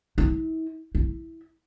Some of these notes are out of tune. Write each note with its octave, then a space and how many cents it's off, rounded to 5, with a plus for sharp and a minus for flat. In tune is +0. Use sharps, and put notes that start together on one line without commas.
E4 -40
E4 -10